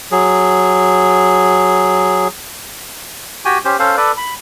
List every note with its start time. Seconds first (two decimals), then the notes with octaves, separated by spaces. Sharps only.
0.12 F#3 G#4
3.45 F#4 G4 G5 G#5
3.65 C#4 G4 C5
3.79 C#4 A4 C5 F5
3.97 A4 B4 D5
4.17 B5